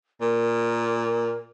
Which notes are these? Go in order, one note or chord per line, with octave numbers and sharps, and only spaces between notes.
A#2 A#4